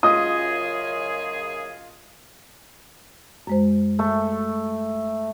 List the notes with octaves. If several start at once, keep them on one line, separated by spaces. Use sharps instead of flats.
F#2 C#3 F4 G#4 D#5 D#6
F#2 G#3 C5
A3